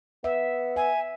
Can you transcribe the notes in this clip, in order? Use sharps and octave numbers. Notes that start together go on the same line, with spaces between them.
B3 E5
E5 G#5